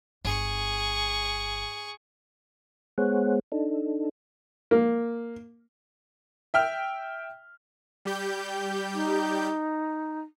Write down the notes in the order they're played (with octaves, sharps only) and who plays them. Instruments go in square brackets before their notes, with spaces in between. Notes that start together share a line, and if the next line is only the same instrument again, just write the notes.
[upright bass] G1 [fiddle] G#4 C#6
[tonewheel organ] G#3 B3 G#4 C5 C#5 F#5
D4 D#4 A4
[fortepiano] A#3
[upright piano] E5 G5 F6
[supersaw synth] G3 G4 G6
[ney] D#4